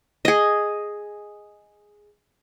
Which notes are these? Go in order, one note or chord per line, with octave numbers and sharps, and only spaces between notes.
G#4 D#5